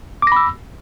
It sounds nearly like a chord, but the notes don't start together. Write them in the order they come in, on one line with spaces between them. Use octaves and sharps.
D6 A#6 B5 E6